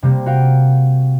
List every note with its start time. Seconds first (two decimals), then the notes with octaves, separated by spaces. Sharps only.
0.03 C3 G3 A#3
0.26 F#4 A#4 F5 G5